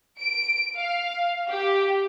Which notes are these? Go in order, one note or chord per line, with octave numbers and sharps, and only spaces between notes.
D7
F5
G4